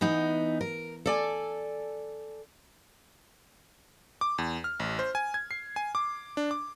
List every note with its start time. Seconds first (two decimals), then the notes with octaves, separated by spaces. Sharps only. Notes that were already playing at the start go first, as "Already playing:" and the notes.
0.01 E3 B3 D#4
0.61 A#4
1.06 A4 D5 G#5
4.21 D6
4.38 E2
4.64 F6
4.80 A1
4.99 C5
5.15 G#5
5.34 G#6
5.51 C7
5.76 G#5
5.95 D6
6.37 D4
6.51 D6